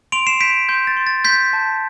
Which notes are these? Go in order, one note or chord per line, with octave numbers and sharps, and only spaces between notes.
C6 D7 F7
C7 E7
G6 B6 D7
C6 G6
A6
C6
A6
C6 G6 B6
A5